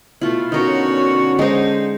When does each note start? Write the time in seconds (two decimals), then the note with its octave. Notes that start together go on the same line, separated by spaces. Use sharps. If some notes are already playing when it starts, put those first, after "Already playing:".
0.21 B2 A3 E4 F4
0.52 B2 D3 C#4 D#4 F#4 A#4 C#5 A#5
1.39 G#3 D#4 C5